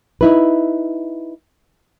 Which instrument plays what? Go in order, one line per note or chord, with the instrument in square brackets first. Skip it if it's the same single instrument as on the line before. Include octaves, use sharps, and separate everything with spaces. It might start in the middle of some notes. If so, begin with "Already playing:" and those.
[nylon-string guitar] D#4 E4 B4